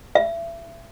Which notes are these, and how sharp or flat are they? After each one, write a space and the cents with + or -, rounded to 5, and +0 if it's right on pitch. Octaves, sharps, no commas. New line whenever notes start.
E5 +30